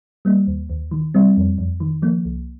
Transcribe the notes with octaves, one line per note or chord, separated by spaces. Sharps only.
G3 A#3
D#2
D#2
D#3
G3 C4
F2
F2
D#3
F3 A#3
C2